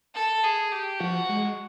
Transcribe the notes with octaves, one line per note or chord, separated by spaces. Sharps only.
A4
G#4
G4
F3 F#4
G#3